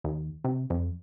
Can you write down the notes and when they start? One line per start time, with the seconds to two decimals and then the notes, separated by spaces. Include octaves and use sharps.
0.04 D#2
0.44 C3
0.70 F2